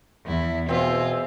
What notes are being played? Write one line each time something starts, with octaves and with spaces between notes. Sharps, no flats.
E2 E4
B2 C4 F4 G#4 E5